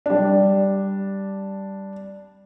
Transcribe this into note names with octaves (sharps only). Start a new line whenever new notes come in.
G3 D4